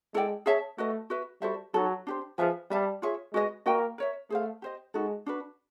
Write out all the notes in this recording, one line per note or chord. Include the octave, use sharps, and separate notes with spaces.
G#3 E4 A4 D5 G5
G#4 C#5 E5 A5
A3 F#4 B4 D#5
F#4 B4 E5
G3 F#4 A4 C5 E5
F#3 D#4 F#4 A4 C#5
D4 G4 C5
F3 G#4 B4 E5 G#5
G3 B4 E5 A5
F4 G#4 C#5 E5
G#3 F#4 B4 D#5
A#3 F#4 B4 D#5 G5
A#4 C#5 E5
A3 G#4 C5 F5
G4 C5 D#5
G#3 D#4 F#4 A4
D4 F#4 B4